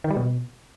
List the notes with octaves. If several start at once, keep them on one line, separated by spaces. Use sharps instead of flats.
D#3
G3
B2